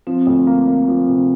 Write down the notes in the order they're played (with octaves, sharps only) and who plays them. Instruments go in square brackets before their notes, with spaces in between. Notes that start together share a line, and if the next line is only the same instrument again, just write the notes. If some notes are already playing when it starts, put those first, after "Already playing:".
[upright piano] F3 [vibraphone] C4
[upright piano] D2
A#3
A#3
F3
C3